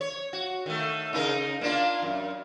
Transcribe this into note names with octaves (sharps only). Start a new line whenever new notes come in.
C#5
F#4
D#3 A3
C#3 D#4 A#4
A#3 D4 F4
F#2